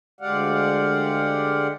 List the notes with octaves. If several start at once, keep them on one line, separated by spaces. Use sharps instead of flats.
D2 G#3 G4 D5 F5 F#5